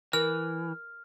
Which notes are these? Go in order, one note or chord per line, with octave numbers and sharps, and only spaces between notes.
E3 A#4 F6